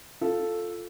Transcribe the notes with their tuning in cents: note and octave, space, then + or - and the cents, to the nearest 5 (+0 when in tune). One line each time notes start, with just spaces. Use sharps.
F4 +5 A4 +0